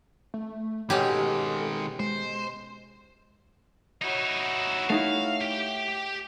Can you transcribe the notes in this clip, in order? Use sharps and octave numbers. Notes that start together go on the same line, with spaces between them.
A3
B2 D#3 G#3 C#4 G4 A4
G#3 C5
D#4 E4 F#4 C#5
A3 D#4 E4 F5
G4 G5